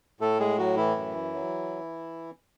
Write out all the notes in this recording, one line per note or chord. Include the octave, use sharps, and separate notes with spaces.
A2 A3 A4
G#3 G#4
F#3 F#4
E3 E4
F#2
F#3